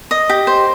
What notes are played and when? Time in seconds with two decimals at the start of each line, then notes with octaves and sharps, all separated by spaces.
0.11 D#5
0.29 G4
0.47 C5